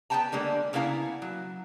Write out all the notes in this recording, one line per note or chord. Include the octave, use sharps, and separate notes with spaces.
B3 B4 D5 G5 A5 A#5
D3 G3 G#3 A#3
C#3 A#3 B3 E4 F5 A#5
F#3